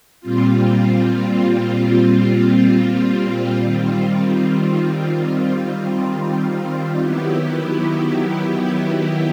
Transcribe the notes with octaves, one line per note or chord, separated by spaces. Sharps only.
A#2 G3 C4 F4
D#3 G3 C4 F4
D#3 F#3 B3 E4 G4